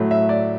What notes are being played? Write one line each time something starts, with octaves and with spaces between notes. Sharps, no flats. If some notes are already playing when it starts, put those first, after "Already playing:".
Already playing: A2 F#3 A3
E5
D5